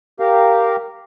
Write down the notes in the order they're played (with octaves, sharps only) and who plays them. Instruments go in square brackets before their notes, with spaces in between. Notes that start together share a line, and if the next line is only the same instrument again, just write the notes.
[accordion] G4 A#4 F5